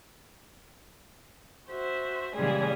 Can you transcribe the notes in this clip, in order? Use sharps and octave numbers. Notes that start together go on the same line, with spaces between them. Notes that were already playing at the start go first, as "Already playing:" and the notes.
F#4 C5 E5
A#2 C#3 E3 G3 G#3 G#4